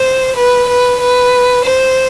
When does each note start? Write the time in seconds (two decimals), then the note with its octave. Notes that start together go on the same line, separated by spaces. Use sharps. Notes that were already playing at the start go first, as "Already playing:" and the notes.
Already playing: C5
0.36 B4
0.68 B4
1.00 B4
1.64 C5